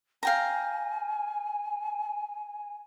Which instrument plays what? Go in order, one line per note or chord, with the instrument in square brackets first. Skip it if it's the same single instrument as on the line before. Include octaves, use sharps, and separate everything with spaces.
[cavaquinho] F5 G5 A#5 [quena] G#5